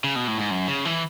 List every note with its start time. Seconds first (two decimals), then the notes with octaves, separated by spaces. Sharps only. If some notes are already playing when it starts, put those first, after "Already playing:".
0.04 C#3
0.16 B2
0.27 A2
0.38 G#2
0.51 F#2
0.67 C#3
0.85 E3